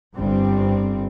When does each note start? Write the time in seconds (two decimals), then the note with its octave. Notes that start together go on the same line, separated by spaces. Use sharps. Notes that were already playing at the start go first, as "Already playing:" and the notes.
0.16 G1 G2 G3 C4